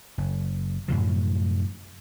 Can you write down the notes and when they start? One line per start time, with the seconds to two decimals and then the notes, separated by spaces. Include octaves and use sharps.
0.18 F#1
0.88 F#2 A2 C3 F3